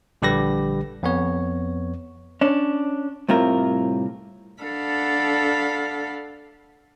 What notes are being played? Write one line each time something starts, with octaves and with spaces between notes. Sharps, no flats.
A#1 D3 G3 G4 B4 A#6
F2 B3 C#5
C#4 D4
C2 A2 C3 F4 A#4
D4 A4 F5 F#5 B5